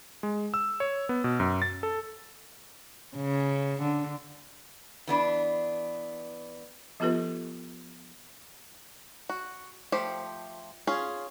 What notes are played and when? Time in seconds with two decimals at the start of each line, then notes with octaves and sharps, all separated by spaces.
0.23 G#3
0.54 E6
0.80 C#5
1.09 B3
1.24 B2
1.40 F#2
1.62 A6
1.83 A4
3.17 C#3
3.82 D3
5.07 E3 B3 D4
7.00 F3 B3 F4 G4 A4 B4
9.29 F#4
9.92 F3 A3 G4 C5
10.87 C#4 F4 G#4